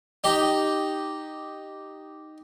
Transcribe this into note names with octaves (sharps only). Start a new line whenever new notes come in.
D#4 G4